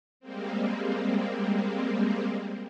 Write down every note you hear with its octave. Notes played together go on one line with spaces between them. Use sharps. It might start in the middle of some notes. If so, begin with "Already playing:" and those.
G3 G#3 A#3 C4